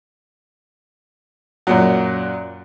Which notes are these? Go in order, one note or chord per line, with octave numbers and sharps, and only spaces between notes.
F#2 A#2 F#3